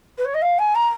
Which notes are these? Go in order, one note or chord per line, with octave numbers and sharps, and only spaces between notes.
B4
C#5
D#5
F5
G#5
A#5